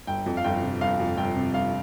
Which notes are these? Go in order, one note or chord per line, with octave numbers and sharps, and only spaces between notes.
G1 G5
F2
F5
G1 G5
C3
G1 F5
F2
G1 G5
C3
G1 F5